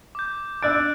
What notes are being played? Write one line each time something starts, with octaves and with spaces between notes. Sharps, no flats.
D6 G6
D4 D5 E6 F#6 A6 D7